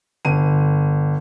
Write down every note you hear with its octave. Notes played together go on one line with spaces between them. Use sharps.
G1 D#7